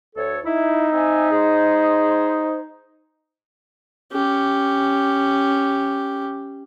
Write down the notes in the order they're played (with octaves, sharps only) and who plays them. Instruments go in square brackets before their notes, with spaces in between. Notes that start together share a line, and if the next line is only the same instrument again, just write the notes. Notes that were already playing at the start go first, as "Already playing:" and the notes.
[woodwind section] D2 A4 C#5
[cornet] D#4 [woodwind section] E4
[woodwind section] C4 E5 G#5
G#3 G#4 C5
[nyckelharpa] C#4 G4